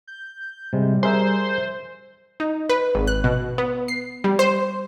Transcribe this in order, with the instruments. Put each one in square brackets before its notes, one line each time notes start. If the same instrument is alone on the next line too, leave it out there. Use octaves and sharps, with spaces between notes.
[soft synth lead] G6
[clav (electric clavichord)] C3 G#3 [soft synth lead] G3
[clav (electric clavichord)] G#4 A#4 E5 [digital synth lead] C5
[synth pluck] D#4
B4
G#1
F#6
B2
B3
C7
G3
C5